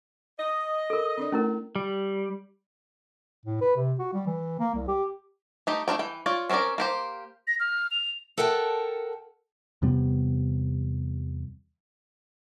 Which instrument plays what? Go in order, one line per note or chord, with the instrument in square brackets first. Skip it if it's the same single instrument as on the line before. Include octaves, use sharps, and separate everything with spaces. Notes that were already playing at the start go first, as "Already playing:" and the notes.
[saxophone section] D#5
[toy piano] A4 A#4
[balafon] C4 D4 D5
[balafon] A3 [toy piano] C#4 E4 A#4
[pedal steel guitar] G3
[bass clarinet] A2
B4
C3
F#4
G3
E3
A#3
C2
G4
[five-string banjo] A3 D#4 G4
A3 D4 A#4 G5
E3 G5
F4 C#5 D5
C4 C#4 A4 A#4 D5
A#3 G4 C5
[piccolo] A#6
F6
F7
[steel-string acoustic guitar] A4 A#4 F#5 G5 A5
[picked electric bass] E2 C3 G3 B3